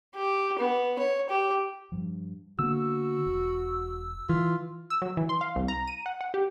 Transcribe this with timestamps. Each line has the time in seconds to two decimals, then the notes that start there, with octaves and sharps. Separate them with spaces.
0.15 G4
0.59 B3
0.99 C#5
1.30 G4
1.92 G2 F3
2.59 D3 A#3 B3 F#4 E6
3.26 E1
4.29 E3 F4
4.90 E6
5.02 F#3
5.17 E3
5.29 C6
5.41 F5
5.56 C2
5.68 A#5
5.87 D#7
6.06 F#5
6.21 F#5
6.34 G4